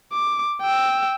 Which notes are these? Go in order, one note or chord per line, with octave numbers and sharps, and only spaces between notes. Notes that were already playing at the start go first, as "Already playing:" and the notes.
D6
G5 E6